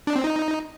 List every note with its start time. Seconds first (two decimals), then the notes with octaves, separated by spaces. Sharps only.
0.07 D4
0.16 C4
0.24 D#4